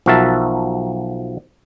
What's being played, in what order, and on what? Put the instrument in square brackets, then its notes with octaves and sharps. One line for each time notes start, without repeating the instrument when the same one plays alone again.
[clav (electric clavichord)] B1 F3 F#4 A#4 E5 A5